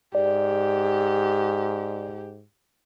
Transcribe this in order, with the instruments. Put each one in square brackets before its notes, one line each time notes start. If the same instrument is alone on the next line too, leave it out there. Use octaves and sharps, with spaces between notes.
[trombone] G#2 [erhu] G4 [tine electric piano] D5